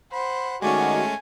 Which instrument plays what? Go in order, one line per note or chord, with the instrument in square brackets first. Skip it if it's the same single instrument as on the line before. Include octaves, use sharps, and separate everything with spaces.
[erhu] C5 [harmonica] F#5 B5
[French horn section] D#3 F#4 [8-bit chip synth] G#3 A3 C#4 [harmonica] D5 C#6 [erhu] G#5